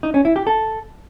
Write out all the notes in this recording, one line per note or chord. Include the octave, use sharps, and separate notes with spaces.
D#4
C#4
E4
G4
A4